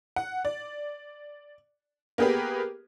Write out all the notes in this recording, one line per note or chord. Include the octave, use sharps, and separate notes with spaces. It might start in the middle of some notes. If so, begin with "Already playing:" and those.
F#5
D5
A#3 B3 G4 G#4 B4